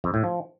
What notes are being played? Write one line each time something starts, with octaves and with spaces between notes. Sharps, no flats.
F2
A2
F3